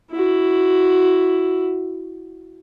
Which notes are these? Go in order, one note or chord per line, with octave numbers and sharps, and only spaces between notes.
E4 F#4